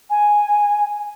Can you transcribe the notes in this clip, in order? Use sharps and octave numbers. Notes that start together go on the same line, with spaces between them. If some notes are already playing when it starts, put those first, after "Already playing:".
G#5